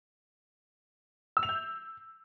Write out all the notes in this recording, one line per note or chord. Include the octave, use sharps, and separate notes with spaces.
E6
F7
G6